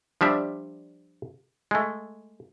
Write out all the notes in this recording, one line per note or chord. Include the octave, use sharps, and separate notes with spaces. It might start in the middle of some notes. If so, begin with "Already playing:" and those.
F3 G3 D4 E5
G#3 A3